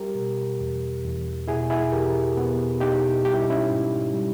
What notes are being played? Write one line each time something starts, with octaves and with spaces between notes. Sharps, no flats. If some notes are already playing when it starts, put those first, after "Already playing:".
Already playing: G3 G4 A#4
B2
E2
E2
B2 E4 G#4
E4 G#4
E2 G4 A#4
B2 B3
B2 D#4 G4
G3 G4
E4
D#4
C#4 E4
G#2
G3